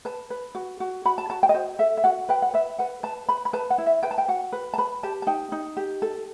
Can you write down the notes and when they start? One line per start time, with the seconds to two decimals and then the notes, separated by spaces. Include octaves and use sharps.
0.05 B4 A5
0.30 B4
0.55 F#4
0.80 F#4
1.05 F#4 B5
1.18 A5
1.30 F#4 A5
1.43 G5
1.49 D#5
1.54 F#4 C5
1.79 A4 E5
1.97 E5
2.04 F#4 F#5
2.29 B4 G5
2.42 F#5
2.54 B4 E5
2.79 B4 F#5
3.03 B4 A5
3.29 B4 B5
3.45 B5
3.53 B4 A5
3.70 F#5
3.78 E4
3.86 E5
4.03 B4 G5
4.11 A5
4.18 G5
4.28 F#4 F#5
4.52 B4
4.74 A5
4.78 B4 B5
5.03 G4 A5
5.22 A5
5.27 D#4 G5
5.52 D#4
5.77 G4
6.02 A4